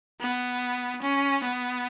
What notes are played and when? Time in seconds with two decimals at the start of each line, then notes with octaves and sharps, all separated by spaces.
0.20 B3
1.02 C#4
1.44 B3